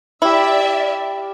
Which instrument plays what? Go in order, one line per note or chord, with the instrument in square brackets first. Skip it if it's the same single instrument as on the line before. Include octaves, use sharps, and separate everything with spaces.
[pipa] E4 [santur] G4 F5 [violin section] D5 E5